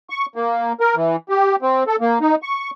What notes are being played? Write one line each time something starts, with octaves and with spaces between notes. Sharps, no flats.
C#6
A#3
A#4
E3
G4
C4
A4
A#3
D#4
C#6